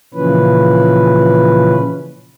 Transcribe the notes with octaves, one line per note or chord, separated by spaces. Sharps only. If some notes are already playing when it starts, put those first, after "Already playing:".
A#2 C#3 E3 F3 C#4 B4